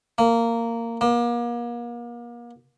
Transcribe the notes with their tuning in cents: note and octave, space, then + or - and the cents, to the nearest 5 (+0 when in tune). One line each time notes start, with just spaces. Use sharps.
A#3 -15
A#3 +35